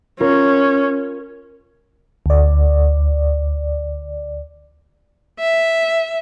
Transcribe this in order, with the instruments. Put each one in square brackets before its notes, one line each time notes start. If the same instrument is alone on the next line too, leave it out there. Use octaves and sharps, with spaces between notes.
[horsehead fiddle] C#4 [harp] F4 A#4 C#5
[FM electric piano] D2 D5
[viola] E5